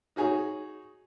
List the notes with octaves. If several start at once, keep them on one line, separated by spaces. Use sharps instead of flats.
D#4 F#4 G#4 C#5